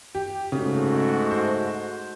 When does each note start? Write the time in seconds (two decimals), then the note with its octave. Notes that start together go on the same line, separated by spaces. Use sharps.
0.15 G4
0.52 G#2 C#3 A3 F#4
1.31 C5